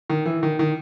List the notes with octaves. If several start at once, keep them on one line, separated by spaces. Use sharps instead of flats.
D#3
E3
D#3
D#3